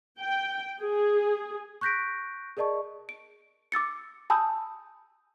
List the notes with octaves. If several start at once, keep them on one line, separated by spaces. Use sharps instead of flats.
G5
G#4
C#6 F#6 G6 A#6 B6 D7
G#4 A#4 D5 D#5 A5 C#6
D7
D6 E6 A6 C#7
G#5 A5 B5 D#6 E6 G6